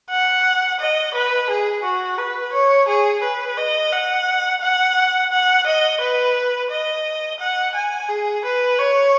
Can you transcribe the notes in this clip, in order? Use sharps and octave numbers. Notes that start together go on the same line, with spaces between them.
F#5
D#5
B4
G#4
F#4
B4
C#5
G#4
B4
D#5
F#5
F#5
F#5
D#5
B4
D#5
F#5
G#5
G#4
B4
C#5